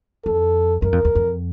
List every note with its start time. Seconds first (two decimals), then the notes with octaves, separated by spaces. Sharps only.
0.25 F2 A4
0.82 F#2 A#4
0.92 F2
1.05 E2
1.15 F2